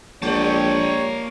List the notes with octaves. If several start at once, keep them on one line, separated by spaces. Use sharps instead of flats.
A#1 G3 A#3 C#5 D5 A5